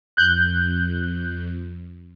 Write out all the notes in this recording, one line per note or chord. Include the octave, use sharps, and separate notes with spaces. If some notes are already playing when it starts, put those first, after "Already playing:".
F2 F#6 G6